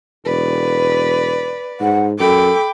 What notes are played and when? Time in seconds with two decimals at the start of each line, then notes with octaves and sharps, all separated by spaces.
0.25 E1 B4 D5
1.80 G#2 F#5
2.19 F#2 A4 G5 B5 D6